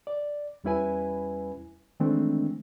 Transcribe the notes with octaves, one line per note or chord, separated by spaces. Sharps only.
D5
E2 G3 C#4 E4 B4 G#5
D#3 E3 G#3 A3 C4 D4